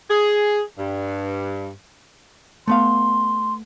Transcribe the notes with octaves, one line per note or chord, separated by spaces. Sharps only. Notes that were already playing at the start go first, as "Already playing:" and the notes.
G#4
G2
A3 B3 F5 C6